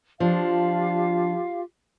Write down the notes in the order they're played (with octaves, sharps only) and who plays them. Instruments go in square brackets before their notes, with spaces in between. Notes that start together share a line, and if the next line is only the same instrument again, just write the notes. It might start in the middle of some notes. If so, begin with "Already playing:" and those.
[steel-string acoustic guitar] F3 D4 [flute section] F4 G4 F5